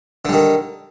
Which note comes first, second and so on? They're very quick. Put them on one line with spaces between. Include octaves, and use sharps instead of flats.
D3 G3 D#3